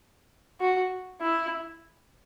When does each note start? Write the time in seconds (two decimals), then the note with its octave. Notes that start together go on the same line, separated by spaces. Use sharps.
0.60 F#4
1.21 E4